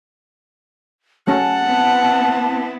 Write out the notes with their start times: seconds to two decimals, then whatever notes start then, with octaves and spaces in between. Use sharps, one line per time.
1.27 F#3 A3 C#4 F#5 A5
1.65 B3 C4 E4